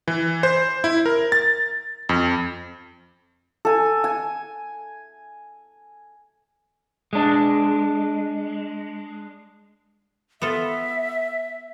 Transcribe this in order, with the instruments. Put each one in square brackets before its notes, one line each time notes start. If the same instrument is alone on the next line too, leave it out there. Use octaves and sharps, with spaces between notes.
[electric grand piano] E3
C5
E4
A#4
A6
F2
[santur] A4 G#5
G#5
[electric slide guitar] G#3 D4
[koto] B3 F4 A4 [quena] E5